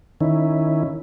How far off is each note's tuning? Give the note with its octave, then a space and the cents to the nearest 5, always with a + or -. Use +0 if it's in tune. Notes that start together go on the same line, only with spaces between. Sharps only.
D#3 +0 C#4 +0 E4 +0